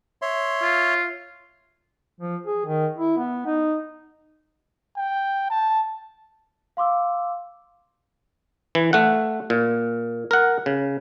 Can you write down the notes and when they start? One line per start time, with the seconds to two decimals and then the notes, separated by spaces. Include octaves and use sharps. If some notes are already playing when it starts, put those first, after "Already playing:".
0.22 C#5 E5 C6
0.62 F4
2.20 F3
2.46 G#4
2.65 D#3
2.98 E4
3.17 B3
3.46 D#4
4.97 G5
5.50 A5
6.77 F5 C6 D6 E6
8.75 E3
8.93 A3 F#5
9.50 A#2
10.31 A#4 F#5
10.66 C#3